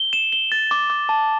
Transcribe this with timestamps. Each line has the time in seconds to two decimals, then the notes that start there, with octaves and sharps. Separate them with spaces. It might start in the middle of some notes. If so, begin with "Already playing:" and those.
Already playing: G7
0.13 E7
0.33 G7
0.52 A6
0.71 D6
0.90 D6
1.09 A5